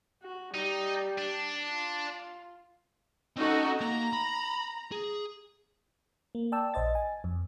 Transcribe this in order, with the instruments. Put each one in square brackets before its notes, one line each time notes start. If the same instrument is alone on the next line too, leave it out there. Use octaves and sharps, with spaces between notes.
[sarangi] F#4
[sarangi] G3 [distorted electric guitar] D#4
[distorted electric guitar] D4
[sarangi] F4
[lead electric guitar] C4 C#4 [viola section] D#4 F#4 A4
[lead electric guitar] A#3 [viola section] A#5
[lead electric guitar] B5
G#4
[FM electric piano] A#3
D5 G5 A5 E6
A#1 C5 D#5 A6
G#5
F2